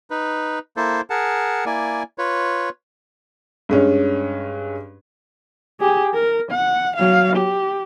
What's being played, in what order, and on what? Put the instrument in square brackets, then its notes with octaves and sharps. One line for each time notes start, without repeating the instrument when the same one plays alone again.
[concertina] D#4 B4
A#3 E4 A4 C5
G#4 A#4 F#5 A5
A#3 E4 D5 G#5
F4 B4 C#5
[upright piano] G2 G#3 C#4
[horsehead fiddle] G4 G#4
A#4
F#5
F#3 F5
G4